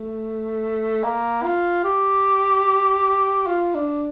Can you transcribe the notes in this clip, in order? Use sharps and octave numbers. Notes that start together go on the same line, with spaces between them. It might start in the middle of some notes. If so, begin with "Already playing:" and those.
Already playing: A3
A#3
F4
G4
F4
D4